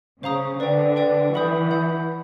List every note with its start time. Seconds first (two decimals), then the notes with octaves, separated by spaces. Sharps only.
0.23 C#3 C5 F5 A#5 D#6
0.60 D3 B4 D5 G5
0.96 B4 D5 G5
1.33 E3 F#5 B5 D#6 G6
1.71 F#5 B5 D#6 G6